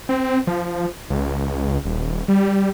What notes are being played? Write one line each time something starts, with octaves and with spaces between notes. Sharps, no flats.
C4
F3
C#2
D#1
G3